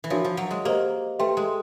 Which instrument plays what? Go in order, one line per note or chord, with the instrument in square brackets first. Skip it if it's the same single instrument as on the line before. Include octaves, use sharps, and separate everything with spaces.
[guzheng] E3
[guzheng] F3 [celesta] D4 F#4 A#4 C#5
[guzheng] F3
F#3
G#3
[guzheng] A#3 [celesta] G4 C5 D#5
[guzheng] A3 [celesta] G4 B4 E5 G5 C6
[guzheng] G#3